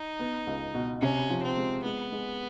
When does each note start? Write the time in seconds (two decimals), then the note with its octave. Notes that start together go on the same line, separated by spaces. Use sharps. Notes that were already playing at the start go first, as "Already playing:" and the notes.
Already playing: D#4
0.19 B3
0.47 C#2
0.74 B2
1.02 C3 C#4
1.30 F3
1.43 C4
1.57 G#3
1.85 G#3 B3
2.12 G#3